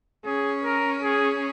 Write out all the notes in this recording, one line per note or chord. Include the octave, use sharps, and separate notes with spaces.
C#4 G#4
A#4
G#4